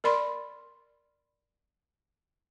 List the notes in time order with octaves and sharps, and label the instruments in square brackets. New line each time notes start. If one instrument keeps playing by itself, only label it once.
[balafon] A#4 D5 B5 C6